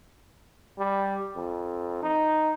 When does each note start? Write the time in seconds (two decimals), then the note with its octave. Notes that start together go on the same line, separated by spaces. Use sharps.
0.78 G3
1.36 F2
2.03 D#4